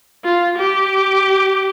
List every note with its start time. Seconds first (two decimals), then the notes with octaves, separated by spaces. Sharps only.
0.24 F4
0.58 G4